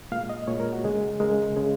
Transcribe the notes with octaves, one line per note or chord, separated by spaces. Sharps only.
A#2 G#3 F5
D#5
A#2 G#3 C#5
A#4
F#4
C#3 G#3 G#4
C#3 G#3 A#4
C#3 G#3 G#4